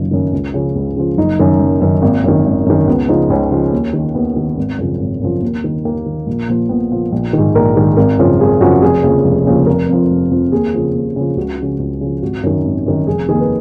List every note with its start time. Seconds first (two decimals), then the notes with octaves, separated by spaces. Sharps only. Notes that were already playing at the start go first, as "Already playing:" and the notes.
Already playing: F#1 F#2 D#3 F4
0.11 F#2 D#3
0.32 C#2
0.54 C#3 F3
0.76 C#2
0.96 C#3 F3
1.18 F#1 D#4
1.39 F#2 D#3
1.60 F#1
1.81 F#2 D#3
2.02 G#1 A#3
2.24 F#2 D#3
2.45 G#1
2.66 F#2 D#3
2.87 C#2 B3
3.08 C#3 F3 D#4
3.30 C#2 C#4
3.51 C#3 F3
3.73 D#2
3.93 D#3
4.15 D#2 B3
4.36 D#3
4.57 G#1
4.78 F#2 C#3 F3
5.00 G#1
5.21 F#2 C#3 F3
5.42 D#2
5.64 D#3
5.85 D#2 A#3
6.06 D#3
6.27 A#1
6.49 A#2 F3
6.69 A#1 B3
6.91 A#2 F3
7.12 A#1
7.33 G#2 D#3
7.55 A#1 A#4
7.76 G#2 D#3
7.97 G#1 A#4
8.18 F#2 C#3 F3
8.40 G#1 G#4
8.61 F#2 C#3 F3 F#4
8.82 F1 G#4
9.04 D#2 C#3 F3
9.25 F1
9.46 D#2 C#3 F3
9.67 F1 A#4
9.89 F2 F3
10.10 F1
10.31 F2 F3
10.52 D#2 G#4
10.74 C#3 F3
10.95 D#2
11.16 C#3 F3
11.37 C#2 F#4
11.58 C#3 F3
11.79 C#2
12.01 C#3 F3
12.22 G#1 F#4
12.43 F#2 D#3
12.65 G#1
12.86 F#2 D#3
13.07 F1 G#4
13.29 D#2 D#3 G#4
13.40 B4